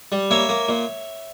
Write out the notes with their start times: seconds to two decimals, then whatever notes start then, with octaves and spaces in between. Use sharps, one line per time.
0.12 G3
0.31 A#3 C#5 E5
0.49 A#3
0.69 A#2